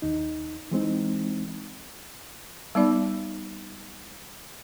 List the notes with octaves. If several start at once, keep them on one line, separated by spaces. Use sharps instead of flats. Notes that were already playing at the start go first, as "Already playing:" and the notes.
D#2 D#4
E3 G#3 C4 D#4
G3 B3 D#4 D5 B5